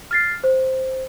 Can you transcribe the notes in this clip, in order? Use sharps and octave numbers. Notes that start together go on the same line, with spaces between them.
F6 A6 C7
C5